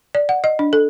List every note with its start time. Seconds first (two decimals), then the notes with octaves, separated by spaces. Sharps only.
0.15 D5
0.29 F#5
0.44 D#5
0.59 D4
0.73 A4